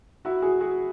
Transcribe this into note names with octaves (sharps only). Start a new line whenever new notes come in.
E4 F#4
F#4 G#4
F#4 G#4